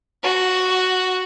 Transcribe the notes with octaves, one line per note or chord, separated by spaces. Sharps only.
F#4